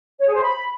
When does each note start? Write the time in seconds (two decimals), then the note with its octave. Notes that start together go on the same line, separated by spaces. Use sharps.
0.20 C#5
0.27 G#4
0.34 C5
0.41 B5